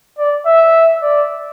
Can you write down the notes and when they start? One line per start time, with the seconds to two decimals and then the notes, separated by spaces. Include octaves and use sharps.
0.18 D5
0.46 E5
1.02 D5